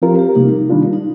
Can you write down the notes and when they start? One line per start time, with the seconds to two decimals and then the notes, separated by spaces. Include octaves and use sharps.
0.02 F3 C4 F4 G4 A#4
0.19 G4
0.35 C3 G3 A#3 D#4
0.69 D#3 G3 D4 F4
0.93 D#4